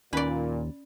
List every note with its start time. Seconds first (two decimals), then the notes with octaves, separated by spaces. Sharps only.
0.13 D#2 A#2 C#4 B4 D5